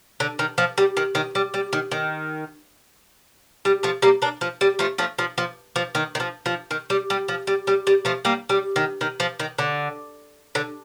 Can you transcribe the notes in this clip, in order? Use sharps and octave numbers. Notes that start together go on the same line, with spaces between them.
D3
D#3
F3
G3
D#3
D#3
G3
G3
D#3
D#3
G3
F3 A3
G3 A#3
A#3 D4
F3
G3
F3 A3
F3 A3
F3
F3
F3
D#3
D#3
F3
F3
D#3
G3
G3
F3
G3
G3
G3
F3 A3
G3 A#3
G3
D#3
D#3
F3
D#3
D3
D3